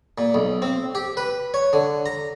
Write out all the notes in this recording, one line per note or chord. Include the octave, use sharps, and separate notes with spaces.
A#2
B1
C4
G4
B4
C#5
D3
A#5